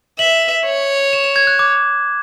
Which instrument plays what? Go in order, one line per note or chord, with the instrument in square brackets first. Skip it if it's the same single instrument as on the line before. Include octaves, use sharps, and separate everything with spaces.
[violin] E5 [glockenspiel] F#7
[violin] C#5
[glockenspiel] E7
E7
G#6
F#6
D6